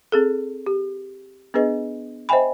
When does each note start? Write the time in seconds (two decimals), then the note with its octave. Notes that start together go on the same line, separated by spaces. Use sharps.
0.12 C4 G#4 A4
0.66 G4
1.54 B3 D4 G#4 B4 D#5
2.29 C5 D#5 E5 G5 G#5 B5